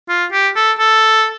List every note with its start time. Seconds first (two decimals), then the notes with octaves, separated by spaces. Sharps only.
0.09 F4
0.32 G4
0.56 A4
0.78 A4